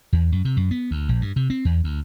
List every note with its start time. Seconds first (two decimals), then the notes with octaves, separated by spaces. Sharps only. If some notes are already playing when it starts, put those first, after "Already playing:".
0.13 E2
0.32 F#2
0.45 C3
0.57 F#2
0.71 B3
0.91 D2
1.09 A#1
1.21 G2
1.36 C3
1.50 C4
1.65 E2
1.84 D2